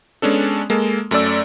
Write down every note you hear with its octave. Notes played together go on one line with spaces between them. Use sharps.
G#3 B3 C#4 D4 A4
G#3 A#3 A4
F#2 A3 C#4 D5 E6